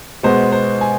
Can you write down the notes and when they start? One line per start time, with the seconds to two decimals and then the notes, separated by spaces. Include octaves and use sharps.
0.23 B2 G#3 B3 C5
0.52 C5
0.81 G#5